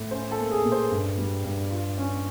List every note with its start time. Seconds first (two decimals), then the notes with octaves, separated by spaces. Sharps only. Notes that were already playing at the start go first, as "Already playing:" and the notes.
Already playing: A2
0.11 C#4 C5
0.31 A4
0.38 A#3
0.51 G#4
0.65 A#2
0.72 C5
0.91 G2
1.18 G3
1.45 G2
1.71 F4
1.98 C#4